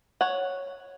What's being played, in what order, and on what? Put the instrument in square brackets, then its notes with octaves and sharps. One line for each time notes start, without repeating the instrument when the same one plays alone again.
[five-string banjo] C#5 F#5